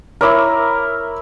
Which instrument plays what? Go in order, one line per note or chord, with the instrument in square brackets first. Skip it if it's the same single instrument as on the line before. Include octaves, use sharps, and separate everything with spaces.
[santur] E4 A#4 [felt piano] C#5 D6 E6